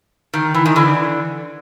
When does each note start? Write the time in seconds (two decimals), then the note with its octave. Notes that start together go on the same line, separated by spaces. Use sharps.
0.34 D#3
0.54 E3
0.66 D#3
0.76 D3 E3